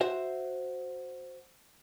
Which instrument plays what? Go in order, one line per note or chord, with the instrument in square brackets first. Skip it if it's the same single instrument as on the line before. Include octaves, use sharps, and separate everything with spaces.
[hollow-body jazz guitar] F#4 C5 E5